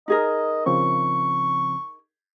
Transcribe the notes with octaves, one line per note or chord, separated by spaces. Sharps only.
D#4 G#4 A#4 D#5
C#3 F3 C4 C#6